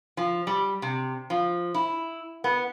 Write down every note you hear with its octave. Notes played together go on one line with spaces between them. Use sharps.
F3
G3
C3
F3
E4
B3